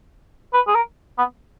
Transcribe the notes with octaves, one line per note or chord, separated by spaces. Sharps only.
B4
G#4
A#4
B3